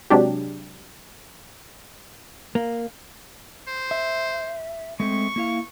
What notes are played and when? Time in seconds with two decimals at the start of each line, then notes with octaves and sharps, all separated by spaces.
0.10 C3 F#3 G#3 D4 G4
2.55 A#3
3.67 C5
3.91 E5
5.00 G#3 A3 C4 C#6
5.36 A#3 E4 F5